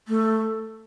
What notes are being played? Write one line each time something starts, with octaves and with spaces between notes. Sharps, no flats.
A3